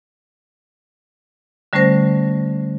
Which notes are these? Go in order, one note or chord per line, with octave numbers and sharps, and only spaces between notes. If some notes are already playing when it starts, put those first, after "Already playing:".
D3 G3 A3 C#4 C5 A#6